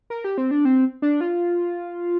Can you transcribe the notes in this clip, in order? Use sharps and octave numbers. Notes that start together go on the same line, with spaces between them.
A#4
G4
C4
D4
C4
D4
F4